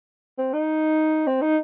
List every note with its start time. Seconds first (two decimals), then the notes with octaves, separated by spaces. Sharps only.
0.39 C4
0.53 D#4
1.27 C4
1.41 D#4